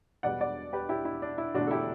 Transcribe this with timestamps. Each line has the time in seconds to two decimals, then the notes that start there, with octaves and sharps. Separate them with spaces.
0.23 E1 E2 B2 G3 B3 D5 F#5
0.41 D5 F#5
0.73 G4 B4
0.89 E4 G4
1.05 E4
1.22 D4
1.38 E4
1.54 E1 E2 D3 A3 D4 F#4
1.67 A4
1.71 E4 G4